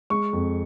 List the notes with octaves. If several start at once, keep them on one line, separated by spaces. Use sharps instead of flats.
G#3 C#6
F2